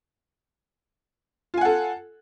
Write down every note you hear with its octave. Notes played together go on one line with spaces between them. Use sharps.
F4 A4 F#5 G#5